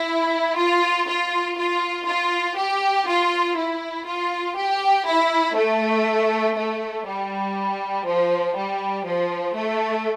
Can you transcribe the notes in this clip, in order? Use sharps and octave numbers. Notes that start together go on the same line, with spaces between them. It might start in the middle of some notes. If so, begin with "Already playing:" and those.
Already playing: E4
F4
F4
F4
F4
G4
F4
E4
F4
G4
E4
A3
A3
G3
F3
G3
F3
A3